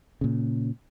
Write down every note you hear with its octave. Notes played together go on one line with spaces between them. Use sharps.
A#2 C#3